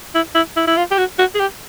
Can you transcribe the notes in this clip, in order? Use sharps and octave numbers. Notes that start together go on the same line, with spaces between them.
E4
E4
E4
E4
F4
G4
F#4
F#4
G#4
G4